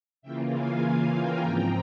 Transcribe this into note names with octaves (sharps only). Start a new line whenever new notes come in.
C#3 E3 A#3 F4 E5 G5
F5 G#5
F5 G#5
G5 A#5
G#2 F3 C4 G5 A#5